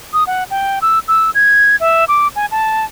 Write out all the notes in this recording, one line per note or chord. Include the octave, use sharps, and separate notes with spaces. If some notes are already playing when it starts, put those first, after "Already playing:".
D#6
F#5
G5
E6
E6
G#6
E5
D6
G#5
A5